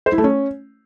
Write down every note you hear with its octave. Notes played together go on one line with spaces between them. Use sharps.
C5
E4
A3
C#4